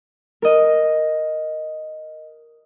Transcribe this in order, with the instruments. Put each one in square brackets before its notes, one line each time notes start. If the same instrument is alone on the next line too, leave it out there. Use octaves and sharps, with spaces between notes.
[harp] A#4 D#5